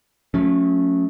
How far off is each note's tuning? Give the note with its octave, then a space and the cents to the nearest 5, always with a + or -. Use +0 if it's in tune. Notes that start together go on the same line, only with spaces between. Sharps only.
F#3 -45 A3 +0 C#4 +0